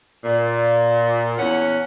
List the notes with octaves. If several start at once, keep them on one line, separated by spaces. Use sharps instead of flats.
A#2
E2 C#4 F#5